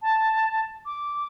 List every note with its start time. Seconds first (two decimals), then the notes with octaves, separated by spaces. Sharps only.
0.02 A5
0.85 D6